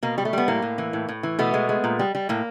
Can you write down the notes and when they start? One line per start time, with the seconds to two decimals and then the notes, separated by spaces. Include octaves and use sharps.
0.03 B2 A#3
0.18 G3
0.25 A3
0.33 G3 B3
0.48 A2 A#3
0.62 A2
0.78 E3
0.93 A2
1.09 A2
1.23 E3
1.39 B2 A3 B3
1.54 G#3
1.69 G#3
1.84 A#2
1.99 G3
2.15 G3
2.29 A2 A#3